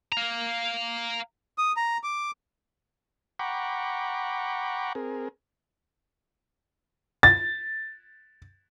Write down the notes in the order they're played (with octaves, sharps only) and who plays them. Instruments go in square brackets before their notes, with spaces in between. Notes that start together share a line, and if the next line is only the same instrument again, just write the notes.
[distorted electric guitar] F5 A#5
[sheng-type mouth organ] D#6
A#5
D6
[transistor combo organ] F#5 G5 A#5 B5 C#6 D6
C4 G#4 A#4
[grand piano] A6